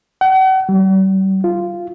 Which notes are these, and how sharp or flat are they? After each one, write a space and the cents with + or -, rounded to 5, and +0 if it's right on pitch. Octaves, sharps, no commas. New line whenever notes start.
F#5 +40
G3 -40
F4 -10